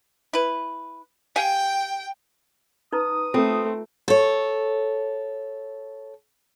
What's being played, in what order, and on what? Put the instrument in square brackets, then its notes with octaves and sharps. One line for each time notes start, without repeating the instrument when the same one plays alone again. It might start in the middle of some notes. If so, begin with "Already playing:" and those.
[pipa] E4 B4
[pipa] G4 F5 G#5 [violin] G5
[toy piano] D#4 B4 A#5 [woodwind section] D#6
[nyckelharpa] A3 [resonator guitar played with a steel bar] C4 [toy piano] F4 A4
[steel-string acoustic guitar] A4 C#5